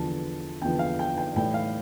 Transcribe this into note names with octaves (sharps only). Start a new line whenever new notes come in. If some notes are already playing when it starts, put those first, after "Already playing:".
Already playing: E2 D3 F3 B3 A5
E2 D3 F3 B3 G5
F5
G5
G5
A2 E3 G3 G5
F5